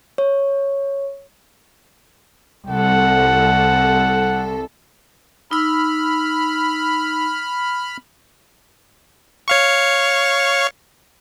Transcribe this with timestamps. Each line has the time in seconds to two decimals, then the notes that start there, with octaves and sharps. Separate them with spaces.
0.18 C#5
2.68 C2 A4 F#5
5.51 D#4 B5 E6 F6
9.48 C#5 F5 C#6